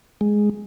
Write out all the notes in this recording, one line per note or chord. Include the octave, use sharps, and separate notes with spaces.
G#3